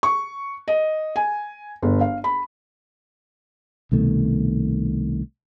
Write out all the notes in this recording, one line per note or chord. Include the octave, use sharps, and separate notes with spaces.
C#6
D#5
G#5
G1
F5
B5
C2 B2 D#3 A3